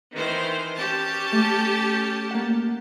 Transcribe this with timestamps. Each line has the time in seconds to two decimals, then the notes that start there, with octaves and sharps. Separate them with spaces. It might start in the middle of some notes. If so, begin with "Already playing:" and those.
0.13 D#3 E3 C5
0.76 C#4 G4 A5
1.32 A3
2.31 A#3 F#5